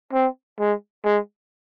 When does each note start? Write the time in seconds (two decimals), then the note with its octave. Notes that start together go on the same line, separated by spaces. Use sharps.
0.13 C4
0.59 G#3
1.04 G#3